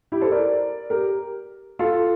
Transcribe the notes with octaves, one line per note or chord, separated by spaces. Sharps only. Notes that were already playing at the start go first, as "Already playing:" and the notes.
E4 G4
A4 C5
A#4 D5
G4 A#4
F4 A4